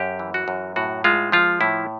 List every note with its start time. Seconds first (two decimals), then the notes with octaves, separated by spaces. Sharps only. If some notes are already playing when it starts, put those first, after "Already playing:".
Already playing: F#2 G4
0.19 E3
0.34 F#4
0.48 F#2
0.76 A2 F#4
1.04 G#3 F4
1.32 F3 F4
1.61 A2 E4